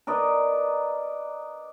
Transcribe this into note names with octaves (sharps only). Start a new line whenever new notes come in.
A#4 B4 D5 D#5